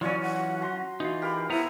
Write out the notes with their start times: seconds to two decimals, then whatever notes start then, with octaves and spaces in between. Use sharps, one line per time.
0.01 E3 F#3 C#4 F4 C#5 D5
0.22 F#5
0.61 F#4 A#5 C6
1.00 E3 D#4 F4 F#4
1.22 G4 A#4 F5 B5
1.50 B3 E4 C5 A#5